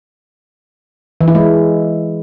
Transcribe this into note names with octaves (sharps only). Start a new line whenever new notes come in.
E3
E4
G#3